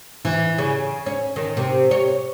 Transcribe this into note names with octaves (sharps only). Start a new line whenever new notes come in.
E3
C#3
C#4
D#3
C3
C#5